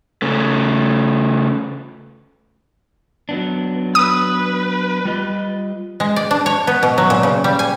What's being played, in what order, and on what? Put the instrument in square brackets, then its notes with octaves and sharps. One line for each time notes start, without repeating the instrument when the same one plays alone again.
[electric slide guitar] C#3 A3
F#3 B3 D4
[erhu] B4 [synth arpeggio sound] D#6
[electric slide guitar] G3 F4 D#5
[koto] G#3
D5
D4
C#5
B3
B2
F#3
A#2
C#3
G3
G#5